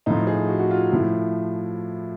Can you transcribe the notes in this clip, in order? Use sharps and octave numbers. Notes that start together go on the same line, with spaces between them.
A2 F3 D#4
G#4
F#4
F#4
F4
A2 F3 E4